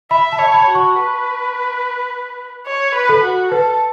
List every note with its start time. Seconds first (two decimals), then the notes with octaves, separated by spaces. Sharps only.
0.11 E5 B5
0.32 A5
0.39 C#5
0.47 A5
0.54 B5
0.68 F#4
0.75 C#6
0.96 B4
2.67 C#5
2.95 B4
3.09 A4
3.24 F#4
3.52 A4 B4